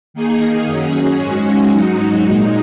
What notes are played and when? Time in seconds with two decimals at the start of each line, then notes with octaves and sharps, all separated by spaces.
0.14 D#3 A#3 D#4 G#4
0.66 F#2 F#3 C#4 G#4
1.19 G#2 G#3 C#4 F#4
1.72 G#2 F#3 D#4 F#4
2.25 A#2 G#3 D#4